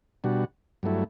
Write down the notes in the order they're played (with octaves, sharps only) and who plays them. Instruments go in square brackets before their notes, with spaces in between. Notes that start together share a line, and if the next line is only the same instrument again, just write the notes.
[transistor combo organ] B2 G3 D4 F#4
G2 F#3 A3 E4